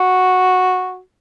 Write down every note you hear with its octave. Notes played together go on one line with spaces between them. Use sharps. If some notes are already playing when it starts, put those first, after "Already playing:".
Already playing: F#4